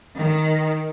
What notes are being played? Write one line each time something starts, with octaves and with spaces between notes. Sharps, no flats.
D#3